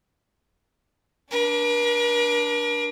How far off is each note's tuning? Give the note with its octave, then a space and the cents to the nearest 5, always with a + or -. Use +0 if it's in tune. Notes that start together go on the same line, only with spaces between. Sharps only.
D4 +0 A#4 +45